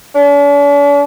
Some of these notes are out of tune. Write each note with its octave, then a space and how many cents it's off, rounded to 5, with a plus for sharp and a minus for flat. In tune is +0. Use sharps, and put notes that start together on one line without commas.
D4 -45